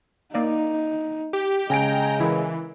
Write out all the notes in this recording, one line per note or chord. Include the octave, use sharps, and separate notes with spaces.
A#3 D#4 D5 F5
G4
C#3 G#3 G5 G#5 A#5 D7
E3 E4 A#4